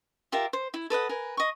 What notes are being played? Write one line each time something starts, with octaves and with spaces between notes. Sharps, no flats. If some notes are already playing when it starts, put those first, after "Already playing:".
F4 G4 A#4 E5
C5
E4
A4 B4 D#5 F#5
A#4 B4 G#5
D#5 C#6